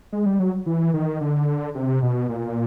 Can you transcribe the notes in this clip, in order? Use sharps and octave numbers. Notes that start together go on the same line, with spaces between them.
G#3
G3
F#3
E3
D#3
D3
C3
B2
A#2